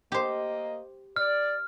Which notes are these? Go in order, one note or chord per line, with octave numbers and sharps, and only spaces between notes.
A#3 G4 C5 D#5
D5 F6